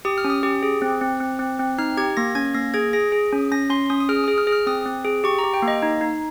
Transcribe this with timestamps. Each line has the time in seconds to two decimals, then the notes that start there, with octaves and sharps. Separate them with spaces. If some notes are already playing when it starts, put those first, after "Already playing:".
0.05 G4 D#6
0.18 F6
0.24 C#4
0.30 D#6
0.43 G4
0.63 G#4
0.82 C4
1.01 C4
1.20 C4
1.39 C4
1.60 C4
1.78 D#4 F6
1.97 G4 G#6
2.17 A#3 A#6
2.35 C#4 G#6
2.54 A#3 A#6
2.74 G#4 G#6
2.93 G#4 A#6
3.12 G#4
3.33 C#4
3.52 C#4 A#6
3.70 C#4 C6
3.90 C#4 D#6
4.00 D#6
4.09 G#4 F6
4.24 D#6
4.28 G#4
4.38 F6
4.47 G#4
4.52 F6
4.67 C4 D#6
4.86 C4
5.05 G#4
5.24 G4 C#6
5.39 A#5
5.44 G4
5.54 G5
5.62 A#3
5.68 D#5
5.82 D#4
6.01 D#4